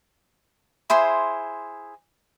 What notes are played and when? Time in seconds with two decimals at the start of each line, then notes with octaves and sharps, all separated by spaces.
0.90 E4 G#4 C5 C6